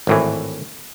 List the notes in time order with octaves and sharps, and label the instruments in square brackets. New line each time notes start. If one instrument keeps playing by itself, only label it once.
[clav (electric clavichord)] G#1 A2 E3